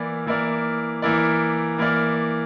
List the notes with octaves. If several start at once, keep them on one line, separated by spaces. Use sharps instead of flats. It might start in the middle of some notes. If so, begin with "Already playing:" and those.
Already playing: E3 A#3 E4 A#4 D5
E3 A#3 E4 A#4 D5
E3 A#3 E4 A#4 D5
E3 A#3 E4 A#4 D5